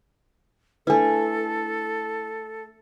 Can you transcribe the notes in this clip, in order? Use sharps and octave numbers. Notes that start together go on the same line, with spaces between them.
A3 D4 E4 A4 B4